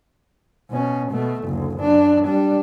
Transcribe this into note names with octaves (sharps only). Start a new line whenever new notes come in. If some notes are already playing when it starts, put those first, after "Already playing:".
B2 C#4
B2 A3
F#1 D2
F#2 D4
G3 D4